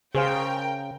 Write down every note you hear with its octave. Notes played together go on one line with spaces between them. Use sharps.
C#3 G#4 A#4 C5 F5 G5